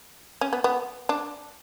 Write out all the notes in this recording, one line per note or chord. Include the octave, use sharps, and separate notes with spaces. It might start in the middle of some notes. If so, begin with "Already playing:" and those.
C#4
B3
B3
D4